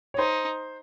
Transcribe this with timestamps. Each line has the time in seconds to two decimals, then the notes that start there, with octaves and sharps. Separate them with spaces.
0.14 C#5
0.18 D#4 C5